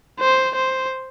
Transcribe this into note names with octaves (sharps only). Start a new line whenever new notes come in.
C5
C5